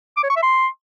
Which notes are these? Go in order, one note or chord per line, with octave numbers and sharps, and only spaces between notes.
D6
C#5
C#6
E5
C6